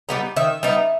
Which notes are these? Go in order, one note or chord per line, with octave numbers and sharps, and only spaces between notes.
G3 B3 D#4
D#3 E5
G3 B3 D#4